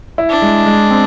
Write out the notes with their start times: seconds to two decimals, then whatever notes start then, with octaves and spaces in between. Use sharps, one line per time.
0.18 E4
0.29 D4
0.42 G#3
0.66 G#3
0.91 C4